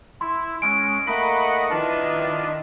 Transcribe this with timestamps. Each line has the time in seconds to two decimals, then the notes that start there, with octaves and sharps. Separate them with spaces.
0.21 E4 C6
0.62 G#3 C#4 D7
1.07 A3 A#3 D#4 D#5 F#5 B5
1.70 D#3 D4 E4 F4 B4 D#5 A5